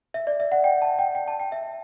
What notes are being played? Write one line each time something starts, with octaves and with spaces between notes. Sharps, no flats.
E5
D5
E5
F#5
G5
A5
G5
G5
A5
G5
E5